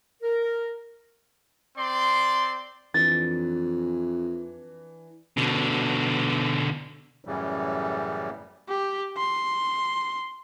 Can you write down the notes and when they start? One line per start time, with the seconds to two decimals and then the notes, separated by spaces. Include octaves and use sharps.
0.22 A#4
1.78 C4 D5 C6
2.94 F2 E3 D4 A6
5.37 B2 D3
7.25 F#2 A2 C#3 E3 G3
8.69 G4
9.18 C6